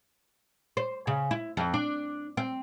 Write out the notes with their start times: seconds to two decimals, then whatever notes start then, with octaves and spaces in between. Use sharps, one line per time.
0.77 C5
1.07 C#3
1.31 E4
1.57 F2
1.74 D4
2.37 C4